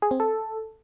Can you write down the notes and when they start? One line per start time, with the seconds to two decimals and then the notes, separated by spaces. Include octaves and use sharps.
0.02 G#4
0.11 C4
0.20 A4